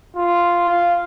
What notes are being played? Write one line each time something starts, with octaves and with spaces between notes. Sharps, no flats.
F4
F5